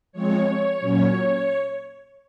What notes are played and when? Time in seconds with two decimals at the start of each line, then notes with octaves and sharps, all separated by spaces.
0.12 F3 G#3 C4 C#5
0.80 A#2 F#3 C#4